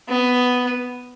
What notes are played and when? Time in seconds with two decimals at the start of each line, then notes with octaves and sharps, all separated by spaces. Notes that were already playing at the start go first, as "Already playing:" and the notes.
0.08 B3